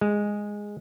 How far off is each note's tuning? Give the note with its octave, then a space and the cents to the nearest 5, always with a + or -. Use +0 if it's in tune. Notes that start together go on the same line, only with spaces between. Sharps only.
G#3 -5